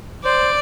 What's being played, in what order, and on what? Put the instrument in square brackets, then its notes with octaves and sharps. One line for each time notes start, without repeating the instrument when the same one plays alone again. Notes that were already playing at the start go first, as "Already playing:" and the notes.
[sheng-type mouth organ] C5 [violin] D5